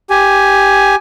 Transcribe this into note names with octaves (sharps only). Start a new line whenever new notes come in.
G4 G#5